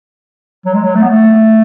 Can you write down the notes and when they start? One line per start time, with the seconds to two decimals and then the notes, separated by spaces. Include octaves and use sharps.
0.65 F#3
0.74 G#3
0.83 F#3
0.95 A3
1.02 B3
1.09 A3